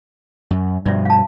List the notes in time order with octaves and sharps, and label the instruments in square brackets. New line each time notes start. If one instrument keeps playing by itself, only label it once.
[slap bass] F#2
[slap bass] G2 B2 F3 [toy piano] D5 E5
[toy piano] F5 A5